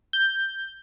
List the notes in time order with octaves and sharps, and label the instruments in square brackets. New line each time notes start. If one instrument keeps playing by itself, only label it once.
[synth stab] G6